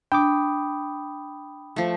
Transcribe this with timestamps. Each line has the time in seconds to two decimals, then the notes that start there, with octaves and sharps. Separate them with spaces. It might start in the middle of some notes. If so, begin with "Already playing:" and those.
0.12 D4 G5 B5 D6 D#6
1.76 F3 A3